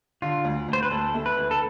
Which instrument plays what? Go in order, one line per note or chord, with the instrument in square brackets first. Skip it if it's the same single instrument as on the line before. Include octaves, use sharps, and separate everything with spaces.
[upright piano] D3 [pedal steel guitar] F4
[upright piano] D2
D2
[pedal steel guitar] C5
B4
[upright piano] D2 [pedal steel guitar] A4
[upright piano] A3
[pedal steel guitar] B4
[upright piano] D2
[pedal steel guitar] A4